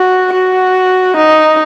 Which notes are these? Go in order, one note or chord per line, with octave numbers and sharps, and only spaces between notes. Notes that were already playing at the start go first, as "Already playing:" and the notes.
Already playing: F#4
F#4
D#4